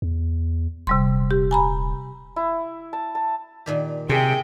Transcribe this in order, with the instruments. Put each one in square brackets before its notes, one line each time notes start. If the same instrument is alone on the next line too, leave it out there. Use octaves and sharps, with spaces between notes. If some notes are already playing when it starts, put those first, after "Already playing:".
[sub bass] E2
[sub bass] D#1 [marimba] C3 G3 C6
[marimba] G4
G#5 A#5 B5
[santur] E4
A5
A5
[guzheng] A#2 D#3 G4
[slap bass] C3 [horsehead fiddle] G#4 G5 [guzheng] D#5 E5